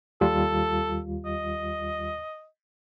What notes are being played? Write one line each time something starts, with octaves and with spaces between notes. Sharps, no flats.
D#2 G3 F4 A4
D#5